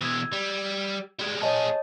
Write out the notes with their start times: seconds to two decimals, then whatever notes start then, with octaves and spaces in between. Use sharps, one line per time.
0.02 B2 E3 E6 G#6
0.33 G3
1.19 G3 G#3
1.42 A#2 G#4 C#5 D#5 A5